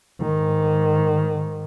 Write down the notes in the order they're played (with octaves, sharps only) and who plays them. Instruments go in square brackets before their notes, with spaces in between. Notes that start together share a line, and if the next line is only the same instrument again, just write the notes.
[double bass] G#2 D#3